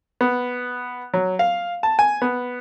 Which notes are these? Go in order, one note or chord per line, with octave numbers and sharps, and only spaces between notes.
B3
F#3
F5
A5
G#5
B3